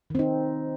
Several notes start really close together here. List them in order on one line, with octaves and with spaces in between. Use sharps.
D#3 C4 D#4